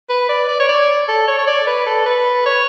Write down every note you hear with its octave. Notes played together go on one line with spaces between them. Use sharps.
B4
D5
D5
C#5
D5
A4
C#5
C#5
D5
B4
A4
B4
C#5